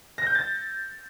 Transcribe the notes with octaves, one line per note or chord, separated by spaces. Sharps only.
A#6
G6
A6